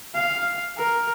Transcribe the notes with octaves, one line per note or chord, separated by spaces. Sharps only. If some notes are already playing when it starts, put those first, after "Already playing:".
F5
A#4